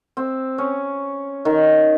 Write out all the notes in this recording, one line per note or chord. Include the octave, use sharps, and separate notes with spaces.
C4
C#4
D#3